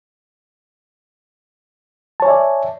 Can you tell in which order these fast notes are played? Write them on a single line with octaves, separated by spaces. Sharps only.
A5 C#5 G#5 E5 D5